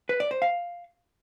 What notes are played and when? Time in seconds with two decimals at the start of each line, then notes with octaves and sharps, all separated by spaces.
0.09 B4
0.20 D5
0.31 C5
0.42 F5